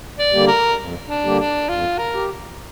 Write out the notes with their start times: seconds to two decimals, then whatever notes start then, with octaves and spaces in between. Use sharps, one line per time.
0.19 D5
0.33 D3 G3 A#3 G4
0.48 A#4
0.79 F2
1.08 D4
1.24 D3 G3 A#3 G4
1.39 D4
1.69 F2 F4
1.98 A#4
2.14 G4